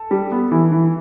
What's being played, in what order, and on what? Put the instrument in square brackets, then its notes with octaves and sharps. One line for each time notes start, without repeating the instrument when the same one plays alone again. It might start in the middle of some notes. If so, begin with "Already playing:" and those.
Already playing: [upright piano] A4
[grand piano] G3
B3
E3
E3